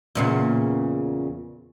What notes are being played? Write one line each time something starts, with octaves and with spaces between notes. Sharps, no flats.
E2 A#2 C#3